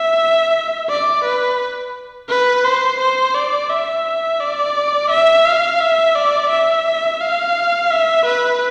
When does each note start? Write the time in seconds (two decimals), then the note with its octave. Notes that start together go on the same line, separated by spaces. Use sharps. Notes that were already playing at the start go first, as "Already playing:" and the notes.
Already playing: E5
0.89 D5
1.25 B4
2.29 B4
2.65 C5
3.00 C5
3.35 D5
3.70 E5
4.40 D5
5.10 E5
5.45 F5
5.80 E5
6.15 D5
6.50 E5
7.21 F5
7.91 E5
8.26 B4